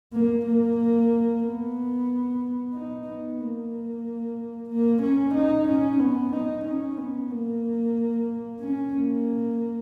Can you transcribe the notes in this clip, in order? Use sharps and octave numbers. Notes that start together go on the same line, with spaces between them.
A#3
A#3
B3
D#4
B3
A#3
A#3
C#4
D#4
C#4
B3
D#4
C#4
B3
A#3
C#4
A#3